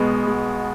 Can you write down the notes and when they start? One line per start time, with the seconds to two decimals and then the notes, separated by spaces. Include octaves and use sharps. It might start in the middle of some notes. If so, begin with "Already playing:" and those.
Already playing: B1 B2 G#3 B3
0.27 G#3